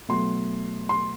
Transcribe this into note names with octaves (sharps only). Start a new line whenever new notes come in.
B2 F#3 A3 C6
C6